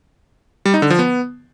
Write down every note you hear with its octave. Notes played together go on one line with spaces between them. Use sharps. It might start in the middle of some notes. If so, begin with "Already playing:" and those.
G3
D#4
D3
F3
B3